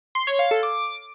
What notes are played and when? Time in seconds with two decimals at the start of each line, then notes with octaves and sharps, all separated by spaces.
0.15 C6
0.27 C#5
0.39 F5
0.51 A4
0.63 D6